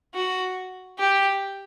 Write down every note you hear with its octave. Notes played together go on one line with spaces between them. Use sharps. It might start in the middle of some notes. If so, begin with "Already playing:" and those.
F#4
G4